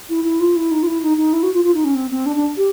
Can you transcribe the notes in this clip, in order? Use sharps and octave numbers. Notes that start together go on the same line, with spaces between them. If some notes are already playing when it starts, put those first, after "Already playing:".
E4
E4
F4
E4
D#4
F4
E4
D#4
D#4
E4
F#4
F4
F4
D#4
C#4
C4
C4
D4
D4
G4